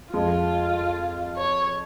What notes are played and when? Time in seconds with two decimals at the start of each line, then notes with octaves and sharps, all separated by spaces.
0.13 F2 F3 G#3 F4
1.36 C#5